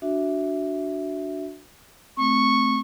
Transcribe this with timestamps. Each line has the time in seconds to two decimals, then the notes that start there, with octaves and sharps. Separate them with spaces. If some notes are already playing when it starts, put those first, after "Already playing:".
0.02 D4 F#4 E5
2.17 A3 C4 C#6